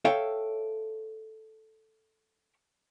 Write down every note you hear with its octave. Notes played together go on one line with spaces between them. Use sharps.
A4 C#5 E5 F5 G5